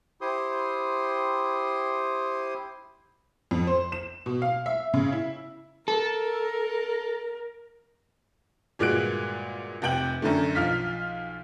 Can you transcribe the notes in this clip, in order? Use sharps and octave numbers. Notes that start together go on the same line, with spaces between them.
E4 G4 C5 C6 D#6
F2
C5
E7
B2
F5
E5
C#3
E4
A4 A#4
G1 A#2 G#3 F#4 F#6 D7
F1 C3 G5 G6 F#7
F#2 D3 A3
B1 F3 F4 F6 B6